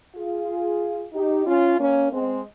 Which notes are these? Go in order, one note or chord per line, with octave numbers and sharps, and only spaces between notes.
F4 G#4
D#4 G4
C#4 F4
A#3 C#4
G#3 C4